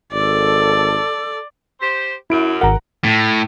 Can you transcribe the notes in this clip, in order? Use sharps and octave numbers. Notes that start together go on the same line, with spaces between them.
G#1 A4 D5
G4 C5
F#2 E4 D7
G#1 A#4 F#5 A#5
A2